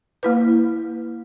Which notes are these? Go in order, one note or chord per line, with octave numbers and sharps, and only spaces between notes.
A#3 E4 B4